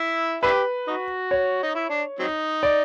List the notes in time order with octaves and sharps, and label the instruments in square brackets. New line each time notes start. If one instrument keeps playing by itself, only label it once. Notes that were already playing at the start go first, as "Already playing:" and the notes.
Already playing: [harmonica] E4
[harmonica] D4 E4 G4 [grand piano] B4
[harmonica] D#4 F#4
[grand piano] C#5
[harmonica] D#4
E4
D4
F#3 C4 D#4
[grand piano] D5